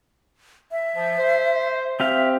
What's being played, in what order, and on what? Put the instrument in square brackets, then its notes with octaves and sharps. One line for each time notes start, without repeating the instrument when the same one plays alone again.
[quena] E5
[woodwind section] F3
C5
[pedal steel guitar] C4 G4 F5 [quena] E5